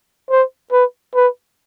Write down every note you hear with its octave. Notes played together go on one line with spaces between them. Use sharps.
C5
B4
B4